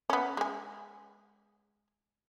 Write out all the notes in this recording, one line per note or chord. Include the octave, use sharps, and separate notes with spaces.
B3 C#4
G#3 G#5